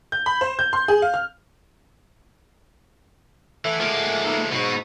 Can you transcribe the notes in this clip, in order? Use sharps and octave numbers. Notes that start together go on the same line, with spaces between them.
G6
B5
C5
G6
C6
G#4
F5
F6
E3 A3 F#5 G#5 D6
F3 G#3 A#3
B3 D#4 A4
G#2 B2 F#3 D#4 F#4